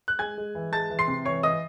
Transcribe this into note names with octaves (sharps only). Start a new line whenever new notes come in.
F#6
G#3 G#5 G#6
G#3
E3
G#3 A5 A6
E3
C6 C7
C3
E3 C#5 C#6
E3 D#5 D#6